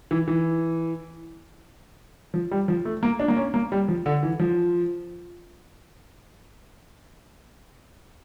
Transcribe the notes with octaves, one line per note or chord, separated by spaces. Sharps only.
E3
E3
F3
G3
F3
A3
A#3
D4
A#3
C#4
A#3
G3
F3
D3
E3
F3